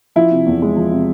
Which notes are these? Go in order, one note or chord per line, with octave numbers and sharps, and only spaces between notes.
F3 E4
C3
E2
G#3
F3
C3